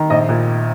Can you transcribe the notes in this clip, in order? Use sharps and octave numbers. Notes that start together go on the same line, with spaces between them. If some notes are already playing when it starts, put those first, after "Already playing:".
Already playing: D#3
A#1 D#5
A#2